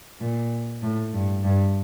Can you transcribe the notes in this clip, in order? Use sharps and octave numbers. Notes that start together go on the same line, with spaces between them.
A#2
A2
G2
G2